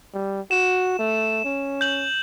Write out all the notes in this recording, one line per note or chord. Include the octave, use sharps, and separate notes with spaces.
G3
F#4 E7
A3
C#4
G6 F#7